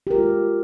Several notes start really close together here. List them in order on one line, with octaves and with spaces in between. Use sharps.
G4 A#4 F4 G#3